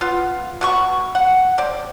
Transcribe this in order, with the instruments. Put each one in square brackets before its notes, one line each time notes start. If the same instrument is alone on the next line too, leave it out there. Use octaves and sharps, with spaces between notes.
[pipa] B3 F4
B2 B3 C#6
F#5
C4 D5